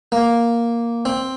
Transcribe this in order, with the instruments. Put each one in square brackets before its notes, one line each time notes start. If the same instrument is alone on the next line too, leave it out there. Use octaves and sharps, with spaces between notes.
[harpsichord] A#3
C4